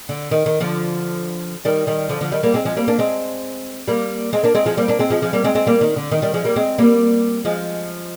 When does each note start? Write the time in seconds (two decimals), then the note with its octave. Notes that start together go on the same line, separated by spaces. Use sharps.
0.09 D3
0.31 D#3
0.46 D#3
0.60 D3 F3
1.65 D#3 G3
1.87 D#3 G3
2.09 D3 F3
2.21 D3 F3
2.32 D#3 G3
2.43 G3 A#3
2.54 G#3 C4
2.65 F3 G#3
2.76 G3 A#3
2.88 A#3 D4
2.99 G#3 C4
3.88 G3 A#3
4.33 G#3 C4
4.43 A#3 D4
4.55 G#3 C4
4.66 F3 G#3
4.77 G3 A#3
4.88 A#3 D4
4.99 G#3 C4
5.10 F3 G#3
5.22 F3 G#3
5.33 G3 A#3
5.44 G#3 C4
5.55 G#3 C4
5.66 G3 A#3
5.81 D#3
5.96 D3
6.11 D#3
6.22 D#3 G3
6.34 F3 G#3
6.45 G3 A#3
6.56 G#3 C4
6.78 G3 A#3
7.45 F3 G#3